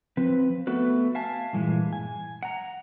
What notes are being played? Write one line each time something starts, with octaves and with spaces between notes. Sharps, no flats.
F3 C4 B4
A3 B3 F#4 B4
E5 F5 G#5 A5
G2 A#2 E3 G#3
G#5
F#5 A#5